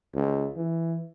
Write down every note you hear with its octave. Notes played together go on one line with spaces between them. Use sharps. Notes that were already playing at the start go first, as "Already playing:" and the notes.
C#2
E3